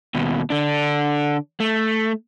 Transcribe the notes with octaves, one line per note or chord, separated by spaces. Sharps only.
D#2 B2
D3 D4
A3